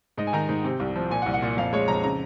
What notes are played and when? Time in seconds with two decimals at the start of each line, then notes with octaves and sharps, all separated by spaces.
0.18 G#2 D#5
0.27 G#5
0.33 D#3 A#5
0.49 G#2
0.64 C3
0.80 C2
0.96 F3
1.10 A#2 G#5
1.22 F#5
1.26 C2
1.34 F#5
1.42 A#2
1.57 F2 F5
1.73 G#3 C#5
1.88 F2 A#5
2.03 C#3 A#5